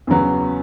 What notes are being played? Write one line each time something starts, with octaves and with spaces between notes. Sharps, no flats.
E2 C#3 F#3 B3